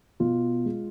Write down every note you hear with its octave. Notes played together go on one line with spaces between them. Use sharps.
B2 F4
G#3